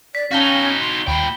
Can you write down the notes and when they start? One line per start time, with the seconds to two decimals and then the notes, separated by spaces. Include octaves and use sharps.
0.15 D5 B6
0.31 C#4 D#4 F#4 F5 G5 A5 B6 G7
0.81 C6
1.07 D#2 A#2 G5 B5 C7